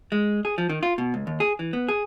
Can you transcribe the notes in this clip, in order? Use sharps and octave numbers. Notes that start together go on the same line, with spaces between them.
G#3
G#4
F3
D#3
F4
B2
C#2
D#2
G#4
E3
B3
G#4